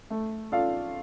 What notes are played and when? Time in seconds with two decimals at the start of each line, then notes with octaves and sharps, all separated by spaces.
0.10 A3
0.52 F4 A4 D5 F5